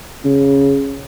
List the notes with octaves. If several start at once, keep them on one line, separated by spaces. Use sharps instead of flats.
C#3